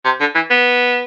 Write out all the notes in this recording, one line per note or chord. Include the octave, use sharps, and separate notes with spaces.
C3
D3
E3
B3